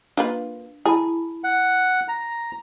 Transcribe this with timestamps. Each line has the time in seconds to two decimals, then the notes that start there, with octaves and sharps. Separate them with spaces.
0.17 A#3 D4 F4 B4
0.85 E4 G#4 A5 B5
1.44 F#5
2.08 A#5